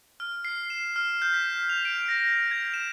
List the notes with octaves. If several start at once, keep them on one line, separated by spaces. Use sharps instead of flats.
F6
C7
E7
F6
G6
B6
F7
D7
A#6
G#6
E7